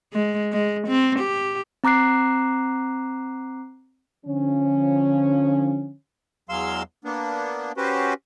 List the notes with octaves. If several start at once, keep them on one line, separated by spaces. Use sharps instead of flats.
G#3
G#3
C4
G4
C4 A#5 D6 F#6 C7
D3 F3 C#4
E2 F#3 G#3 F5 C6 E6
A#3 B3 D4
C#4 F#4 G4 B4 C5